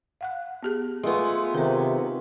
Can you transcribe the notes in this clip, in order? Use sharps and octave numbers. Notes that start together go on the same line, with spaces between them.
F5 F#5 F#6
B3 G4 G#4
G#3 A3 B3 F4 C#5 G#5
C3 D#3 A4 C5